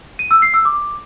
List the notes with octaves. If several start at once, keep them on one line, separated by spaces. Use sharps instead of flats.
D#7
E6
C7
E6
D6